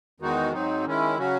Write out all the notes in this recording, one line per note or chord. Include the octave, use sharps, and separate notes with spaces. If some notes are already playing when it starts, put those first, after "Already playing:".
E2 D#3 G#3 D#4 F#4
G#2 F#3 C4 D#4
D#3 G#3 C#4 E4
C#3 F#3 C#4 F#4